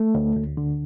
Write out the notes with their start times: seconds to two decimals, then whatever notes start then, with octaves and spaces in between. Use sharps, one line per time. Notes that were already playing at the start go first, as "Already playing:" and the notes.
Already playing: A3
0.15 D2
0.36 D2
0.57 D3